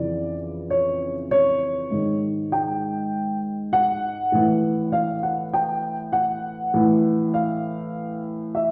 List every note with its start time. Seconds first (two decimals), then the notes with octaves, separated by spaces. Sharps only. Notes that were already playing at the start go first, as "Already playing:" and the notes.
Already playing: F2 C#3 E3 D5
0.70 C#5
1.31 C#5
1.91 G#2 D#3
2.52 G5
3.73 F#5
4.32 A2 E3
4.92 F5
5.23 F#5
5.54 G5
6.13 F#5
6.74 A2 E3
7.34 F5
8.55 E5